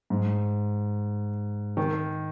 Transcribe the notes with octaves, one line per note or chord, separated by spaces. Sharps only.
G#2
D#3